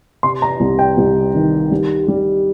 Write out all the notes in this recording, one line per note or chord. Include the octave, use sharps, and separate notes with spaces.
C3 C6
A#5
C2
G5
C2
D#3
G3
G3